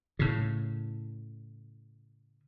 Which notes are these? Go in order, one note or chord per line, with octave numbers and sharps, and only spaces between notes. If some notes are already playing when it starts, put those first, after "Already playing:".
A2 C#3